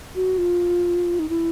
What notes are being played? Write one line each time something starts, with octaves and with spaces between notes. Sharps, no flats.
F#4
F4
D#4
E4